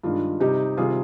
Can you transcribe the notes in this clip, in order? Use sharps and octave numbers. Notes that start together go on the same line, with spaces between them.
G2 D#3 G#3 F4
C3 G3 D#4 G4
C3 D#3 G3 F4 G#4